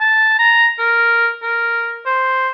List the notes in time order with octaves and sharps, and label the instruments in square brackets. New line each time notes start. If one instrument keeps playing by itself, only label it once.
[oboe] A5
A#5
A#4
A#4
C5